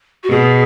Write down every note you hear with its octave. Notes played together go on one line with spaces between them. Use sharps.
F#4
B2 G#4